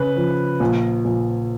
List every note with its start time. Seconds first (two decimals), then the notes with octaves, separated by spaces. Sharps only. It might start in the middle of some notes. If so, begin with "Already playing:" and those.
Already playing: C#3 B4
0.16 F3
0.60 A#1
1.05 A#1